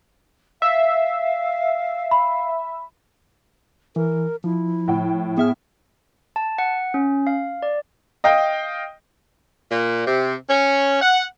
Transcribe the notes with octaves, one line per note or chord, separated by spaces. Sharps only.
E5 F5
B5
E3 A#4
F3 E4
A2 G5
B3 G#4 E5 F6
A5
F#5
C#4
F5
D5
D#5 F5 G5
A#2
C3
C#4
F#5